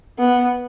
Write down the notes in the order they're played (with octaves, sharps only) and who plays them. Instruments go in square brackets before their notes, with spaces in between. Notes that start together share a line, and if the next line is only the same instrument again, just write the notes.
[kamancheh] B3